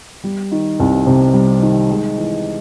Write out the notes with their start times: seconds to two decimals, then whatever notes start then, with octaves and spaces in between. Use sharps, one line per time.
0.24 G3
0.52 D#3
0.80 C2
1.07 C3
1.33 G3
1.62 D#3
1.89 G#3
2.17 E3